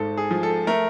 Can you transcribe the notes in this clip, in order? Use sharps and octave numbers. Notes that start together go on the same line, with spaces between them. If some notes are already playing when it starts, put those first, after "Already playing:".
Already playing: G#1 G#2 A4
G#4
F3
A4
A3 A#4